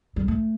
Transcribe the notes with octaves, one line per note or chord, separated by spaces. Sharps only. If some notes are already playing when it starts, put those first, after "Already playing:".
G3
A3